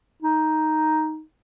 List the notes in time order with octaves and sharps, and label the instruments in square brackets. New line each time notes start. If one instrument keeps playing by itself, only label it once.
[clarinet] D#4